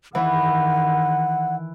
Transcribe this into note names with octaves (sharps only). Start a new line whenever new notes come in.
D#3 E3 E4 F#5